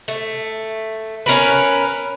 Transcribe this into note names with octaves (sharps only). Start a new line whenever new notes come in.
A3
C#4 A#4 B4